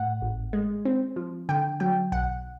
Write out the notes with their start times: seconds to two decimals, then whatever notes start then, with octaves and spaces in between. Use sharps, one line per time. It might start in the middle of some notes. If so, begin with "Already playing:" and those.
Already playing: A2 F#5
0.22 G#1
0.53 G#3
0.85 C4
1.16 F3
1.49 D3 G5
1.80 F#3 G5
2.12 B1 F#5